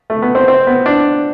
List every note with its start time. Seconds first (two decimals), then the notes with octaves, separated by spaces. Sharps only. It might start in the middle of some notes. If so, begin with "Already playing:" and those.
0.10 A3
0.22 B3
0.35 C4
0.48 C4
0.67 B3
0.86 D4